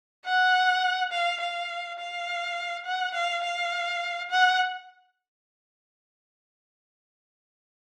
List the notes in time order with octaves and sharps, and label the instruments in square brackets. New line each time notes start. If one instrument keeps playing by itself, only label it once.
[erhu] F#5
F5
F5
F5
F#5
F5
F5
F#5